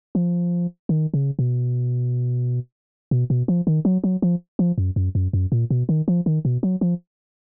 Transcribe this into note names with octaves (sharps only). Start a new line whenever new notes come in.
F3
D#3
C#3
B2
B2
B2
F3
D#3
F#3
F#3
F3
F3
F#2
F#2
F#2
F#2
A#2
B2
D#3
F3
D#3
B2
F#3
F3